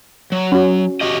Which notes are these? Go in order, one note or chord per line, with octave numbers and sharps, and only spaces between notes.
F#3
C#4 F#4
F#4 G4 D#5